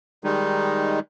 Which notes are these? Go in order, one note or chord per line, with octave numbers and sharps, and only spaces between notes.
D#3 G3 G#3 D#4